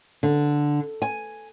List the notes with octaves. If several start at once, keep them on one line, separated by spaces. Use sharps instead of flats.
D3
G#5